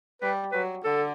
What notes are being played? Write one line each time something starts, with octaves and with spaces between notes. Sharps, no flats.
G3 B4
F#3 B4
D3 A4